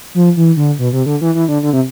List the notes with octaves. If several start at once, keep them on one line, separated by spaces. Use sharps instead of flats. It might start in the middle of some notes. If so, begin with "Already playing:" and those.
F3
E3
D3
B2
C3
D3
E3
E3
D3
D3
C3